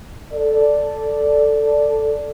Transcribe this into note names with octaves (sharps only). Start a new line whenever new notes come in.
A4 D5